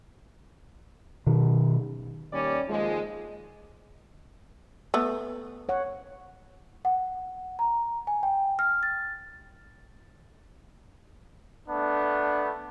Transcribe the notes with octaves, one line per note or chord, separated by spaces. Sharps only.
B2 D#3
D#2 G3 C#4 D5
D#2 F3 G#3
A3 B3
C#5 F#5
F#5
A#5
G#5
G5
F6
A6
A3 B3 D4